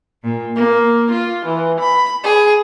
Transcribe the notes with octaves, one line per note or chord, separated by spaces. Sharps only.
A#2
A#3
F4
E3
B5
G#4